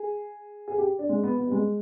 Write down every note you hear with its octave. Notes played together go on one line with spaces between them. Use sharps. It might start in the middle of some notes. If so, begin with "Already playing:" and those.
Already playing: G#4
G#4
G4
D4
G#3
B3
B3
G3
G#3